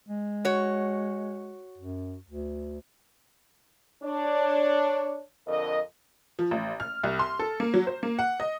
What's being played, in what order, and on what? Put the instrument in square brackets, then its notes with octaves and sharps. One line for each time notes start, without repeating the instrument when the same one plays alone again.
[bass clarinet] G#3
[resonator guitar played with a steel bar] F#4 C#5
[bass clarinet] F#2
D2
[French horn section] D4 C#5
F2 D3 A#4 D#5
[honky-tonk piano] F3
A1
F6
C2
C6
A4
A#3
F#3
C5
A#3
F#5
D#5